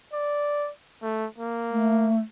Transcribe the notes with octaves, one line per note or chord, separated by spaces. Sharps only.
D5
A3
A#3
A3